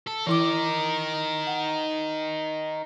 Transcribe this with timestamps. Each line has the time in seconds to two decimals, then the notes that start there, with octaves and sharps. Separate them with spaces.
0.07 A4
0.27 E3 D#4 E4 A#4 D6
1.47 F#5